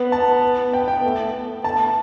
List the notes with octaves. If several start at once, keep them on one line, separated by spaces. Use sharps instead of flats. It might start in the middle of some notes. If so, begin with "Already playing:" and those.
Already playing: B3
A5
B3 G5
G5
A3
B3
A3 A5